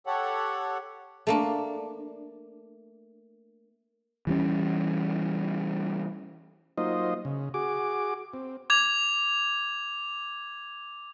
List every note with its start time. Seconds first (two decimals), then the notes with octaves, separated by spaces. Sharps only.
0.07 G4 A4 C#5 F#5
1.27 A3 A#3 D4
4.27 E3 G3 C#4
6.78 F#3 A#3 D#4 F4 C5 D#5
7.25 C#3
7.54 F#4 G#4 D6
8.34 C4
8.70 D6 G#6 F7